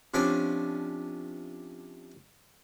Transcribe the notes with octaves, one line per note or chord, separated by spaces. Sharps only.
C3 F3 C#4 D4 D6